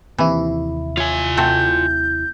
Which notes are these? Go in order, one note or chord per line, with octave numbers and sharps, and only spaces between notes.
D#2 C3 E3 E4
F4 C#5 G#5
A3 C4 F#4 G6